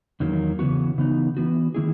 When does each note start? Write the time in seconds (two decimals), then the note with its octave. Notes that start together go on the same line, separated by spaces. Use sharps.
0.20 E2 D#3 F#3 A#3
0.59 C#3 E3 B3 F#4
0.98 C#3 E3 B3 D#4
1.37 E3 B3 F#4
1.75 D#3 A#3 E4 G#4